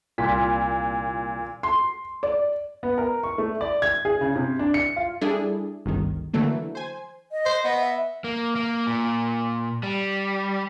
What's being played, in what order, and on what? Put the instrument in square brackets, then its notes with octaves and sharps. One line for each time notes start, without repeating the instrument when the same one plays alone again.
[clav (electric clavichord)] C2 F4 [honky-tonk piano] A#2 B6
[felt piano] C6
D5
[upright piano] B3
A#4
C#6
A3
D5
G#6
G#4
C#3
C3
D4
C#7
F4
[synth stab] G3 D4 E4 G#4 A4
G1 C#2 D#3
D3 E3 F#3 A3 A#3
C5 G#5
[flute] D#5
[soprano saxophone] C5
[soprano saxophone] B3 [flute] D#5
[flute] E5
[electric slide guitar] A#3
A#3
A#2
G3